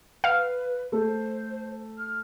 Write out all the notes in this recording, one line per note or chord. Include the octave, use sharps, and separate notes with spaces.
B4 F5
A3 C5
F6